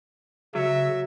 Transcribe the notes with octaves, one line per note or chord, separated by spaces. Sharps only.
C#3 F#3 E5